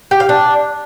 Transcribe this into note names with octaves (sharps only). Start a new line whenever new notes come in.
G4
F5
D4